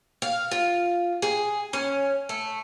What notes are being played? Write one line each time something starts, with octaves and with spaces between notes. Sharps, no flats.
F5
F4
G#4
C#4
A3